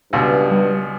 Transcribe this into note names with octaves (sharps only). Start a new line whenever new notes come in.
C#2 G2 B2 E6
G3